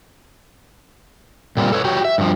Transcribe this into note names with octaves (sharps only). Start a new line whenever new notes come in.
A#2 G3 C4 F4
A4 B4 C#5
F#4 G4 C#5
E5
G2 F3